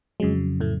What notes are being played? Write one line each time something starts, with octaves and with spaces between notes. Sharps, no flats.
F2 C#3 F#3 G#3
A2 A3